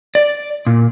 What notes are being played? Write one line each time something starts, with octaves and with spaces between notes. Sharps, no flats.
D5
A#2